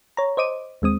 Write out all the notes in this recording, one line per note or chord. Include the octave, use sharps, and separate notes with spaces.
C#5 A#5
C5 D#5 D6 D#7
D#2 G#3 C4 D#6